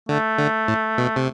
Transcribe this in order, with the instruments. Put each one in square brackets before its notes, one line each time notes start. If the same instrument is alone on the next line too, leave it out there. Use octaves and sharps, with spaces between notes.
[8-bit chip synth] D3 [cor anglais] A3
[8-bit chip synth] D3
A2
B2
C3